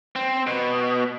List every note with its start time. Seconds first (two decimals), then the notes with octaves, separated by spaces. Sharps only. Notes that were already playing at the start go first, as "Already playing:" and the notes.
0.16 C4
0.47 B2